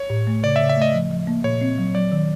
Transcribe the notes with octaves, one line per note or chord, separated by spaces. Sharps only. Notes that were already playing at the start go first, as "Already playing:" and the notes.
Already playing: C#5
A2
A3
C#3 D5
E5
C#3
E5
A3 D#5
F3
F3
A#3
A#2 C#5
C4
F#3
F#3 D5
D#3